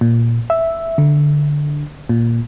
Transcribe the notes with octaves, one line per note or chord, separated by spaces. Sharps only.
A#2
E5
D3
A#2